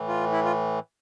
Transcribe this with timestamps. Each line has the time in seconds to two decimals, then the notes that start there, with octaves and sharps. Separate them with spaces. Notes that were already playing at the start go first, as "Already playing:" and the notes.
Already playing: A2 E3
0.08 F4
0.32 E4
0.44 F4